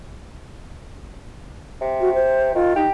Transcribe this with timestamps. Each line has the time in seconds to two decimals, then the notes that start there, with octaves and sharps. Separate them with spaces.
1.81 C3
2.00 F#4
2.14 C5
2.55 D#3 F4
2.76 D#4 G4